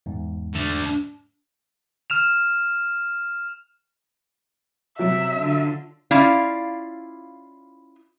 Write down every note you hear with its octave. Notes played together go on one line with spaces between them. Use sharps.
E2 G#2
D3 A3
F6 E7 F7
C3 F#3 E5
D3 F4
C#4 E4 F4 D5 F5